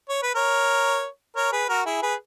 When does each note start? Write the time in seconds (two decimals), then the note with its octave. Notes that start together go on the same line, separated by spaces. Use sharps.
0.09 C#5
0.23 B4
0.35 A#4 C#5
1.36 A#4 C#5
1.52 G#4 B4
1.69 F#4 A#4
1.86 E4 G#4
2.02 G#4 B4